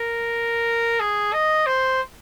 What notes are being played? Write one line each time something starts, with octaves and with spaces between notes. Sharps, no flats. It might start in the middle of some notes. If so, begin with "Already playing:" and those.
Already playing: A#4
G#4
D#5
C5